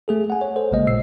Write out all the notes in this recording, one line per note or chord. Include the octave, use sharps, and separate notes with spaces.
A3 G#4 A4
F#5 G#5
C#5
A4 C5
A1 C#3 G#3 A#3 D#5
A#2 E6 C7